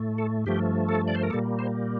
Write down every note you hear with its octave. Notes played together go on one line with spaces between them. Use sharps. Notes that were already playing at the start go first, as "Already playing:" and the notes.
Already playing: A2 A3
A4
G2 F3 A3 G4
A4
D5
C5
A#4
A#2 G3 A#3 A4
C5